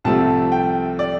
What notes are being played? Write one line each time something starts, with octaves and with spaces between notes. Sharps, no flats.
C2 C3 F3 A3 C4 A5
G5
D5